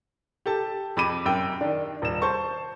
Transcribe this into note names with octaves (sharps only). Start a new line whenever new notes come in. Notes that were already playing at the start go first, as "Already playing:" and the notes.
G4 A4 A5
F2 B5 D6 D#7
F#2 G5
D#3 D4
D#1 E7
C5 A5 C#6